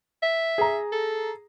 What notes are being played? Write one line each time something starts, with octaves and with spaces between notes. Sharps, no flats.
E5
G#4 A#5
A4